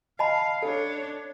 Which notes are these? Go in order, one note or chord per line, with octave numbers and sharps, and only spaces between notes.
D#5 F5 A5 B5
D4 A4 C#5